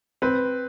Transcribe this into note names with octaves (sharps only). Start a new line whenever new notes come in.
C4 B4